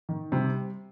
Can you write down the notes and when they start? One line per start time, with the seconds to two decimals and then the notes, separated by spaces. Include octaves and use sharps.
0.09 D#3
0.32 C3 G3